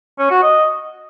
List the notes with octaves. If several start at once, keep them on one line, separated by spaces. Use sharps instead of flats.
C#4
F#4
D#5